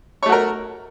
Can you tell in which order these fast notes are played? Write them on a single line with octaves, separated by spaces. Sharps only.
C#5 A3 F#4 A#4